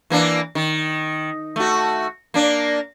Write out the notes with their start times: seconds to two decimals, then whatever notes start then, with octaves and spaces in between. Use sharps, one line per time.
0.10 E3 A#3 D4
0.55 D#3
1.56 A3 F#4
2.34 A#3 D4